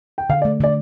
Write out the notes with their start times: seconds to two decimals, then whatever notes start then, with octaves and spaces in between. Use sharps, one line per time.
0.18 G5
0.30 D3 F5
0.42 D5
0.45 A3
0.61 D3 D5